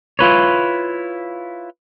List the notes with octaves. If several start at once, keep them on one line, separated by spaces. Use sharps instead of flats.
E4 F4 B4 C#5